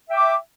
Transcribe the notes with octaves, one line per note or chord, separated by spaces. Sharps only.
E5 G5 D6